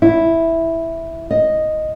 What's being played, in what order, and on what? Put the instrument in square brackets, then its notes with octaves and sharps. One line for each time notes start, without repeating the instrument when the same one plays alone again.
[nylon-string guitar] E4
D#5